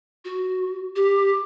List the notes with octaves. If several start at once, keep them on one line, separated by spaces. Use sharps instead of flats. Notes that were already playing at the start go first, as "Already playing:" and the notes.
F#4
G4